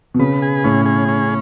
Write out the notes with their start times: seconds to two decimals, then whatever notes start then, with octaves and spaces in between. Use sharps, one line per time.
0.14 B2
0.19 C#3 B4
0.42 G#4
0.64 A2 C#4
0.86 G#4
1.08 C#4